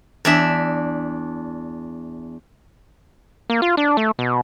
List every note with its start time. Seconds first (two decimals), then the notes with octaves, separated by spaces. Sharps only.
0.25 E2 D4 E5
3.50 A#3
3.62 F4
3.77 D4
3.97 A3
4.19 B2